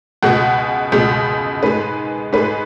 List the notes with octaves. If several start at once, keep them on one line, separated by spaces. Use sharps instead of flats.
C#2 B2 G#3 F#5
C#2 B2 G#3
G#2 G#3 B4
G#2 G#3 B4